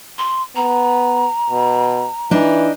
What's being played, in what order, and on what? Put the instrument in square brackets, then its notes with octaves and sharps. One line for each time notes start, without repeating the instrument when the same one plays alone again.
[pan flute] C6
[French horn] B3 [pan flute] A#5
[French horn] B2
[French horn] E3 [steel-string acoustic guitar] D4 D#4